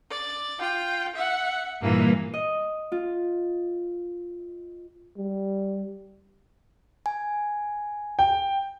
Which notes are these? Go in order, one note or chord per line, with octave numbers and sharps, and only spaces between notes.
D5
F4 G5
E5 F#5
G2 A#2 E3 A#3
D#5
F4
G3
G#5
G5